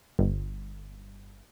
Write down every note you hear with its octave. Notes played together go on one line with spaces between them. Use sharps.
G1